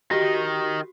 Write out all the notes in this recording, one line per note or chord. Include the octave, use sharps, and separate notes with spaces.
D#3 D#4 F#4 G4